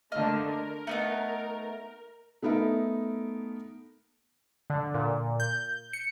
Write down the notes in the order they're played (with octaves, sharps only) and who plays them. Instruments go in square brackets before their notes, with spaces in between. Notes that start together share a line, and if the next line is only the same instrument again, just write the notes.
[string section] D3 A3 A#3 [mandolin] D#5 F6
[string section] A#4
[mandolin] A3 B3 D#4
[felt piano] A3 B3 D#4 A#4 E5
[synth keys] D3
A#2
G6
C#7